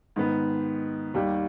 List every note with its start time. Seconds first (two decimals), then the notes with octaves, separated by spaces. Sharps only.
0.16 G#2 D#3 B3
1.14 D#2 D#3 G3